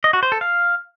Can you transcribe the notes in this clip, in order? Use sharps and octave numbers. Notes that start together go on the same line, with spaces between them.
D#5
F#4
C5
A4
F5